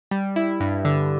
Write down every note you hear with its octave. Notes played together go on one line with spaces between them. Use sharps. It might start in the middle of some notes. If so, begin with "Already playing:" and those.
G3
E4
G2
D3